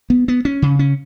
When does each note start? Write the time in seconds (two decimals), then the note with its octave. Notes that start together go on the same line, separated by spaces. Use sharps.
0.10 B3
0.28 B3
0.45 C#4
0.62 C#3
0.79 C#4